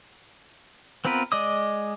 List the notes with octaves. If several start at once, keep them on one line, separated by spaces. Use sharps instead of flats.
B3 C4 F4 A#4 B4
G#3 D5 D#5 D6 D#6